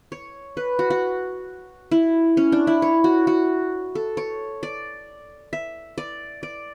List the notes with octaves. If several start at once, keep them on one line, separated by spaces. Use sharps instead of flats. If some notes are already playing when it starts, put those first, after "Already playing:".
C#5
B4
F#4
F#4
E4
C#4
D4
E4
C#5
F#4
F#4
A4
C#5
D5
E5
D5
D5